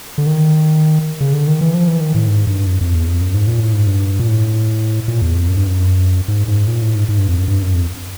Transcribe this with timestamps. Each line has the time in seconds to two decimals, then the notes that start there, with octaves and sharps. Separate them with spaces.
0.18 D3
0.27 D#3
1.21 C#3
1.33 D3
1.48 D#3
1.61 E3
1.74 F3
1.88 E3
2.01 D#3
2.14 A2
2.27 G#2
2.47 G2
2.67 F#2
2.81 F2
2.94 E2
3.07 F2
3.21 F#2
3.34 G#2
3.47 A#2
3.60 A2
3.74 G#2
3.87 G2
4.20 A#2
4.28 A2
5.08 A#2
5.22 E2
5.35 F2
5.48 F#2
5.57 G2
5.67 F#2
6.28 G#2
6.48 G#2
6.68 A#2
6.82 A2
6.95 G#2
7.09 G#2
7.18 G2
7.28 F2
7.39 F#2
7.48 G2
7.62 F#2
7.75 F2